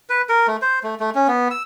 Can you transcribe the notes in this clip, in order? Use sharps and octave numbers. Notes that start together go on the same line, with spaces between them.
B4
A#4
A3
C5
A3
A3
C#4
B3
E6